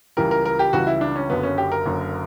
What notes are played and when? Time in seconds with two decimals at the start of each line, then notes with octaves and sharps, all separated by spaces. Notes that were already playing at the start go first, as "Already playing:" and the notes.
0.17 C#2 C#3 E3 G3 A#4
0.31 A#4
0.46 A#4
0.59 G4
0.73 C#2 C#3 E3 G3 F#4
0.87 E4
1.01 D4
1.16 C#4
1.30 F#1 F#2 D3 F#3 B3
1.43 C#4
1.58 G4
1.72 A#4
1.86 F#1 F#2 D3 F#3